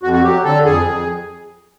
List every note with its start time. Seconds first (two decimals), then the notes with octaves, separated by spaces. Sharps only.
0.03 F2 F#4
0.13 F#4
0.24 F#3 G4
0.44 D3 A4
0.64 F2 G#4
0.85 F2